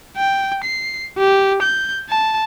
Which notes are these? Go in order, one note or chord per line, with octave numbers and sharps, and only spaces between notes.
G5
C7
G4
G6
A5